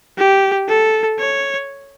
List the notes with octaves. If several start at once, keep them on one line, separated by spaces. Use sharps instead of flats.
G4
A4
C#5